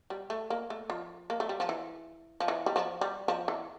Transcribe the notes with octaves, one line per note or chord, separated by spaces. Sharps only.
G3
A3
A#3
A3
F3
A#3
A3
G3
F3
E3
F3
E3
G3
F3
G3
F3
E3